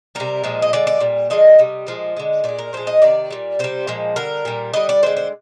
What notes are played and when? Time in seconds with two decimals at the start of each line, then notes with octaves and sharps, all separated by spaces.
0.15 C3 G3 A#4
0.44 A#2 F3 G#3
0.62 D#5
0.73 D3 G#3 D5
0.87 D5
1.00 A#2 G3
1.30 D3 F3 G#3 D#5
1.59 C3 G3
1.87 A#2 F3 G#3
2.17 D3 G#3
2.44 A#2 G#3 D5
2.59 A#4
2.73 A#2 F3 G#3 C5
2.87 D#5
3.02 C3 D#3 D5
3.31 A#2 G3
3.59 C3 G3 C5
3.87 A#2 F3 G#3
4.16 D3 G3 A#4
4.45 A#2 G3
4.74 D3 G3 D#5
4.89 D5
5.03 D3 G#3 C5
5.17 C5